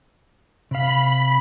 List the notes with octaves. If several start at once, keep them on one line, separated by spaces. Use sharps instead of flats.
C3 F5 B5